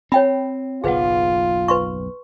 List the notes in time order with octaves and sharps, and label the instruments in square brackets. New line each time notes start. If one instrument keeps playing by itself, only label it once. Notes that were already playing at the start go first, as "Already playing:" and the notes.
[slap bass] C4 [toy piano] C#5 G5 B5
[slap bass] F#1 B1 [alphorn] F4 [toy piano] G#4 B4 F#5
[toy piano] B4 C6 C#6